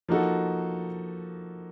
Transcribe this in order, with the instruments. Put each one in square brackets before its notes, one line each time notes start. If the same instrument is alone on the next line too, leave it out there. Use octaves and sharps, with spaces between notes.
[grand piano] F3 A#3 D#4 F#4 A4